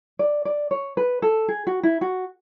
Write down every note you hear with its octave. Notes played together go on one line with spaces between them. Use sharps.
D5
D5
C#5
B4
A4
G#4
F#4
E4
F#4